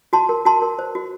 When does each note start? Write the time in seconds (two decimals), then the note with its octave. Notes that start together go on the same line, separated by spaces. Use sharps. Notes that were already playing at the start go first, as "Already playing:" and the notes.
0.13 F#4 A5 C6
0.29 A#4
0.45 F#4 A5 C6
0.62 A#4
0.79 C5
0.95 F#4